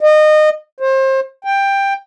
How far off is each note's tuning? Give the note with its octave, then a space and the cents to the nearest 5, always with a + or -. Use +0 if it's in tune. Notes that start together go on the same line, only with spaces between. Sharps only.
D#5 -25
C5 +30
G5 +10